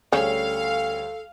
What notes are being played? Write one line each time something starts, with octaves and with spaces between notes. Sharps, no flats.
D2 C#3 G3 C#4 A4 C#5 F5